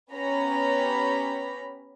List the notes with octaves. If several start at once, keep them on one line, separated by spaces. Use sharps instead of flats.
B3 C#4 G4 A#5 B5